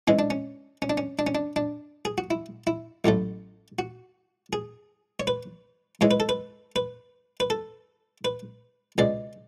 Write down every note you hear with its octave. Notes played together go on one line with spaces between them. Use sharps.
G#2 E3 G#3 C#4
D4
C#4
C#4
D4
C#4
D4
C#4
D4
D4
G#4
F#4
E4
E4
A1 A2 F#3 A3
F#4
G#4
C#5
B4
G#2 E3 G#3 C#5
B4
A4
B4
B4
B4
A4
B4
C#2 B2 G#3 D5